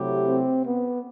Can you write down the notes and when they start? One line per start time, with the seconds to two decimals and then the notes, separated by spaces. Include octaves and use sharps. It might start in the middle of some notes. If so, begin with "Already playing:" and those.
Already playing: C3 F#3 A3 E4 G4
0.28 C4
0.65 B3